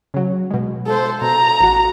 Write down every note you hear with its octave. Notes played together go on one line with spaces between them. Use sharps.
C#3 F#3
B2 G#3
A4 C5
B2 A#5
A1 F#4